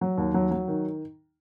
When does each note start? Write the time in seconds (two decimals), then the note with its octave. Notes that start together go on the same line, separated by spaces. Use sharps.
0.01 F#3
0.18 D#2
0.34 F#3
0.51 F#3
0.68 D#3